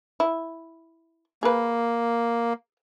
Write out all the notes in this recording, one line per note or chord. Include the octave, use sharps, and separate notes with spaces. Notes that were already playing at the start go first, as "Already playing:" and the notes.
E4
A#3 G#4 B4